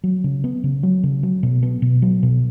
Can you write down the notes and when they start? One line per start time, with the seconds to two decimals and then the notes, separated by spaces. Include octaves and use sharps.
0.04 F#3
0.24 C#3
0.44 B3
0.64 C#3
0.83 F#3
1.03 C#3
1.23 F#3
1.43 B2
1.63 B3
1.82 B2
2.02 F#3
2.23 B2